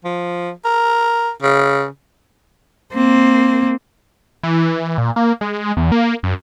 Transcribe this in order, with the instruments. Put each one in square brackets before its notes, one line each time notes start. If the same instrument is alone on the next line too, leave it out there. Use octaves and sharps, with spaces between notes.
[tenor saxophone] F3
A#4
C#3
[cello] A#3 C4
[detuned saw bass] E3
A#2
A#3
G#3
E2
A#3
F#2